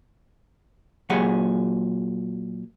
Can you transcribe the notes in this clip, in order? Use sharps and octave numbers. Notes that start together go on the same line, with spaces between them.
A#2 F#3 G4 G#4 F#5